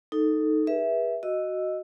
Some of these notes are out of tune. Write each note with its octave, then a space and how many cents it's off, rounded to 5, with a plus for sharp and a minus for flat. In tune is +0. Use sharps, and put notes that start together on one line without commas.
D#4 +0 A4 +0
G#4 -35 B4 -30 E5 +0
F#4 +0 D#5 +0 E6 +0